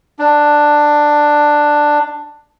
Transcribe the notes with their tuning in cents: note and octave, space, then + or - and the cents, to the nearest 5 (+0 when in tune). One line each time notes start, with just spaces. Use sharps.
D4 +10